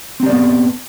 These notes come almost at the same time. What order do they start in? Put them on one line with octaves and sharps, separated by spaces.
C4 G4 D5 B3